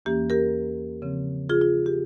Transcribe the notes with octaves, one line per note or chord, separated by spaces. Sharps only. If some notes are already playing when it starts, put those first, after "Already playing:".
E2 E3 A#3 C#4 G4
G4 A#4
C#3 F3 C4
F4 G#4
F4
G4